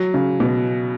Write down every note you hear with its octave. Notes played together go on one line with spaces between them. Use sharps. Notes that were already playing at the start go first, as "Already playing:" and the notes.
Already playing: F#3
C#3
B2